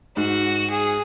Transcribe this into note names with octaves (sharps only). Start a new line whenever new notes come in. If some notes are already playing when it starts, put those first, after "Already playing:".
G#2 F#4
G#4